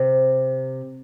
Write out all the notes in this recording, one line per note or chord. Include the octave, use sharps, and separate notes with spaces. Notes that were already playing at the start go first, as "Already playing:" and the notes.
Already playing: C3